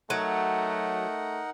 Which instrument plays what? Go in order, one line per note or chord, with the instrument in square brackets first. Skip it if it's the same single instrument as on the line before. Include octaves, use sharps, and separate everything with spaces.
[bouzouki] F#3 [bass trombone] A3 [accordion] D#4 A#4 F#5